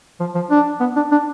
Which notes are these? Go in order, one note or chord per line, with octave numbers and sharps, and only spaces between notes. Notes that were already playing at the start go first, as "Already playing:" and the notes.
F3
F3
D4
B3
D4
D4